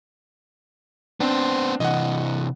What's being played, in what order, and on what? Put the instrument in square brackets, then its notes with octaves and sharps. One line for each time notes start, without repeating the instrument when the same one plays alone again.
[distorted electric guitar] B3 C5 [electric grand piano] C4 D4
[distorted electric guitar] C3 E3 [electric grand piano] D#5 F#5